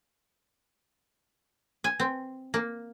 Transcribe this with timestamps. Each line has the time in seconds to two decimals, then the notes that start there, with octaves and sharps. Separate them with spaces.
1.84 G#5
2.00 C4
2.54 A#3